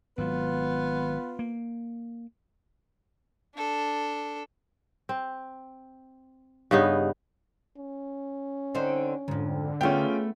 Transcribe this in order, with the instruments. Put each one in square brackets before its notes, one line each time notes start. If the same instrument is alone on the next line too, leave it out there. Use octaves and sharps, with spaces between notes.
[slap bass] G#1 F#3 [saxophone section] B3 F4 B4
[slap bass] A#3
[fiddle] D4 A4
[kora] C4
G2 C#3 B3 D#4
[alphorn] C#4
[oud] D3 C4 D#4
[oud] F2 G#2 [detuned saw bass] D3
[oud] A3 B3 [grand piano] C#4 F4 G5 [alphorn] G#4